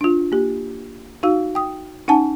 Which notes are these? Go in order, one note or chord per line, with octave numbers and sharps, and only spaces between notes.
D4 F4
A#3 G4
D#4 F#4 F5 E6
G5 D#6
C#4 D#4 F#5 G#5 A5